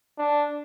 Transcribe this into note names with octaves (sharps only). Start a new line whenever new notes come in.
D4